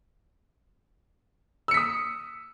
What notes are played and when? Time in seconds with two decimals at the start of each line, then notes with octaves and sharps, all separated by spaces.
1.68 E6
1.71 C#7
1.74 B6
1.77 D#6